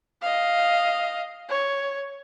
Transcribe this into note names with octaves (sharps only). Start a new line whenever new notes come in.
D#5 F5
C#5